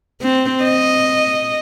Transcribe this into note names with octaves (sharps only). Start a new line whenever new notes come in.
C4
D#5